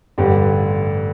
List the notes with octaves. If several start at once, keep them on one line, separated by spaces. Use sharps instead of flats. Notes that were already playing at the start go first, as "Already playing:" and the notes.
A1 G2 D3 G4